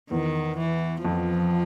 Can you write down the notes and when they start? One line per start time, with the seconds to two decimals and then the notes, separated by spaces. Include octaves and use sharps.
0.11 E2 D#3
0.58 E3
1.05 F2 F3